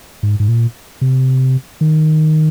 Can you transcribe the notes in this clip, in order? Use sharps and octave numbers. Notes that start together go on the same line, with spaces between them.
G#2
G#2
A#2
C3
D#3